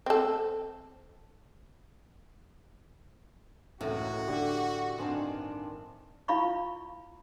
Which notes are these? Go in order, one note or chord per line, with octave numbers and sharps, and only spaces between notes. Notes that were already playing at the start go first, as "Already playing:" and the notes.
C4 A4
C#2 F#2 A2 E3 F#4
D3 G4
G2 D#3 C4 D4 G#5 C6
E4 F4 F5 B5 C#6